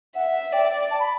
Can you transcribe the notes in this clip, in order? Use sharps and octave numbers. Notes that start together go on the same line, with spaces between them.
E5 F#5
D5 G5
A5
B5